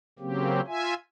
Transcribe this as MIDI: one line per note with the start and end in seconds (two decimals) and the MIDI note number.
0.19 0.61 49
0.19 0.61 54
0.19 0.61 58
0.19 0.61 60
0.19 0.61 67
0.67 0.94 65
0.67 0.94 76
0.67 0.94 80